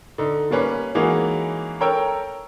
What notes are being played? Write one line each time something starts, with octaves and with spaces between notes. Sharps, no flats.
D3 D#4
G3 A#3 C#4 B4
E3 G#3 A#3 C#4 D#4 F#4
A4 A#4 C#5 G5 E6